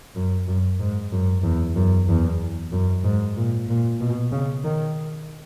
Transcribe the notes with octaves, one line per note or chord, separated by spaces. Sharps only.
F#2
F#2
G#2
F#2
E2
F#2
E2
F#2
G#2
A#2
A#2
B2
C#3
D#3